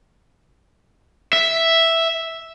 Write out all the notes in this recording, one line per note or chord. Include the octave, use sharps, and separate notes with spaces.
E5